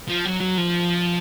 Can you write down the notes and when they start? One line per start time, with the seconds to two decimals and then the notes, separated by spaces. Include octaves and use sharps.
0.08 F3
0.25 F#3
0.40 F#3
0.58 F3